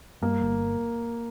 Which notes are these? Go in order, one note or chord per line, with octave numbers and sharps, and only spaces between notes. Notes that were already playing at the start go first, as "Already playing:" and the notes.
G2 A#3
G1